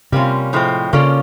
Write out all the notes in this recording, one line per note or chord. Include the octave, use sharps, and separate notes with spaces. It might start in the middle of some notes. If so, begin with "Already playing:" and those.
C3 G3 A#3 C#4 F4
A2 F3 G#3 C4
C#3 A#3 C#4 F4 A4 D5